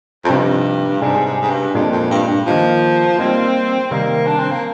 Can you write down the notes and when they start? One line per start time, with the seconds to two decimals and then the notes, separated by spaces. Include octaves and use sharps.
0.25 F2
0.29 G2 C3 F3 C4 D#4
1.02 G#2 C3 G3 D4 G4 C5
1.25 G#2
1.41 G#2
1.50 G2
1.74 F2 A#2 G#3 D4 G4 A#4
1.92 F2
2.10 G2
2.28 G2
2.46 D#3 F3 A#3 D#4 G4
3.18 G3 A#3 C4 D#4
3.91 C3 D#3 G3 A#3
4.27 D4
4.39 C4
4.51 A#3